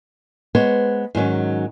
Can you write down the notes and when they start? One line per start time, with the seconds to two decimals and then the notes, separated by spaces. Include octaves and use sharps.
0.55 G#3 B3 C5 C#5
1.15 G#2 D#3 F#3 C#4